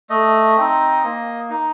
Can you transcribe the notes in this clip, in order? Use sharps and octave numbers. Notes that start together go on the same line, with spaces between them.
A3 D#5
C4 D#4
A#3
D#4